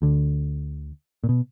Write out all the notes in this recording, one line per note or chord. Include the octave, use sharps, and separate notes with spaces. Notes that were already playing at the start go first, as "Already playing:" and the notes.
D2 D3
A#2
B2